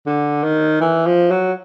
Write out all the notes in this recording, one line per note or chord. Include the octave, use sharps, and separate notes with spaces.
D3
D#3
E3
F3
F#3